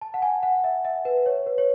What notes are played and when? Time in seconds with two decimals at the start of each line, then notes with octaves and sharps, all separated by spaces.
0.01 A5
0.14 F#5
0.22 G#5
0.43 F#5
0.64 E5
0.85 E5
1.05 B4
1.26 C#5
1.46 B4
1.58 C#5